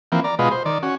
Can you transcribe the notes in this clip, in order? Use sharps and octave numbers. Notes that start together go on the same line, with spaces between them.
E3 F3 A#3 C4
D5 A#5
B2 G#3 F4 B4 D#5
C5
D#3 D5
C#4 F#4